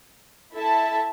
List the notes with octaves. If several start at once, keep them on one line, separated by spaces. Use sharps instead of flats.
E4 A4 E5 A5